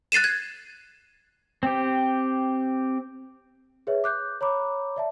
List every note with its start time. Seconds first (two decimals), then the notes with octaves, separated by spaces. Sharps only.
0.12 F#6 A6 C7 D#7 E7
0.24 G#6
1.63 C4 G4
3.87 G#4 B4 C#5 E5
4.04 D6 F#6 G6
4.41 C#5 A#5 B5 D6
4.96 D5 E5 A5